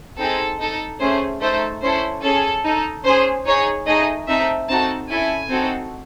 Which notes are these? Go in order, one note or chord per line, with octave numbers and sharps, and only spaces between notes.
C4 D#4 G#4 A4
D#4 A4
A3 C#4 G#4 C5
A3 D#4 A4 C5
C#4 E4 A4 C5
C#4 G#4 A4
D#4 A4
C#4 G#4 C5
D#4 G#4 C#5
A3 D#4 G#4 D#5
C4 D#4 A4 E5
C4 D#4 F#4 A4 A5
C#4 E4 A4 G#5
C4 D#4 F#4 A4